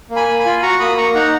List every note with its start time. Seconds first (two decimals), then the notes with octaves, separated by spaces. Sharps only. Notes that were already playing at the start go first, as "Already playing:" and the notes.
0.10 A#3
0.16 G#5 B5
0.28 A#3
0.40 G#5 B5
0.45 F4
0.62 F#4 A#5 C#6
0.79 A#3 B5 D#6
0.97 A#3 A#5 C#6
1.15 D#4 F#5 A#5